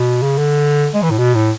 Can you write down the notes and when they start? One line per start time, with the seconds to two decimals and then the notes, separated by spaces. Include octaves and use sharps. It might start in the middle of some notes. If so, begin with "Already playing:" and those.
Already playing: B2
0.22 C#3
0.38 D3
0.94 G#3
1.03 E3
1.11 A2
1.18 B2
1.34 A2